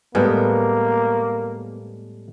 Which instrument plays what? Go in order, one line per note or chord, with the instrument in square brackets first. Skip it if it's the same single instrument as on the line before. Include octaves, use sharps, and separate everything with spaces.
[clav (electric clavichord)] A2 G3 G#3 [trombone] A#3 [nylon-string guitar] B3